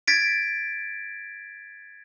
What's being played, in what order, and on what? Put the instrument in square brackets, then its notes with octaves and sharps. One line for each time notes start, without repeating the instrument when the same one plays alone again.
[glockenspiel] G#6 A6 B6 D7